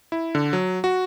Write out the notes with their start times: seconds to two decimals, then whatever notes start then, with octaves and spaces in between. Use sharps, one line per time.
0.12 E4
0.35 D3
0.53 F#3
0.84 F#4